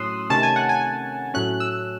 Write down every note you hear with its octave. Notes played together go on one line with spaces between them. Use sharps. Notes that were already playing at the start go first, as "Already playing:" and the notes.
Already playing: A2 F#3 C#4 C6 D#6 E6 F#6
C3 D#3 A3 C#4 A5
G#5
F#5
G#5
A2 F#3 A3 C#4 F#6
E6